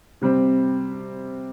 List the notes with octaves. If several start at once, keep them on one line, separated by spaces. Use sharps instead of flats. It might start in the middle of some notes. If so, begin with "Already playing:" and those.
C3 G3 C4